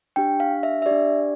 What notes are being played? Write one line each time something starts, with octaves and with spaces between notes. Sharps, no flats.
D4 G4 G5
F5
E5
E5
G4 D5
D4